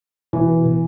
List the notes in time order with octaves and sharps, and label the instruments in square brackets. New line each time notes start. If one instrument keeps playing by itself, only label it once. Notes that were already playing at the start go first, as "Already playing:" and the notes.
[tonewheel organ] B2 [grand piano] E3